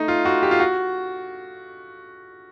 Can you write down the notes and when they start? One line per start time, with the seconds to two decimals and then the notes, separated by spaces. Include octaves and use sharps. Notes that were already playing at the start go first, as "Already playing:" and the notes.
Already playing: A3 D#4
0.08 F4
0.25 F#4
0.43 G4
0.51 F4
0.60 F#4